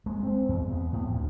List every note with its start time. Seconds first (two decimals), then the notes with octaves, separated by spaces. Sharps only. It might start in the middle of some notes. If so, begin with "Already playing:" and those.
0.06 G#3
0.23 C4
0.49 E2
0.72 B3
0.93 A2
1.10 D2